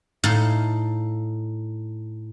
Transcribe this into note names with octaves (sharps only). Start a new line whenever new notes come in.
A2 D#4 A4 F5